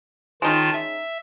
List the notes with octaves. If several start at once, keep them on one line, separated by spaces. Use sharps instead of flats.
D#3 G#3 C#4 D#4 F4 A5
E5